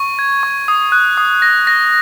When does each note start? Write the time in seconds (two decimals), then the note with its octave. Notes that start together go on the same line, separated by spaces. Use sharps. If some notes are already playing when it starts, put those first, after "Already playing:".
Already playing: C#6
0.19 G#6
0.43 C#6
0.68 D#6
0.92 F#6
1.17 D#6
1.42 A#6
1.67 A#6